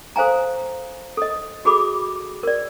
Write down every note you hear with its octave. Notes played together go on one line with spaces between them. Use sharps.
A4 C5 F5 G#5 A#5
A4 D#5
F#4 G#4 A4 B5 D6
A#4 D5